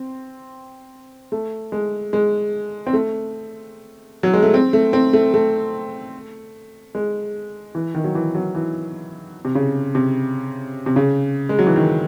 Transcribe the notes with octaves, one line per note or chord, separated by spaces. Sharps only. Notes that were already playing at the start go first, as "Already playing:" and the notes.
Already playing: C4
A3
G#3
G#3
C4
A3
F#3
G#3
A3
C4
A3
C4
A3
A3
G#3
E3
D#3
F#3
E3
F#3
E3
C3
C#3
C3
C3
C#3
G#3
F#3
E3
D#3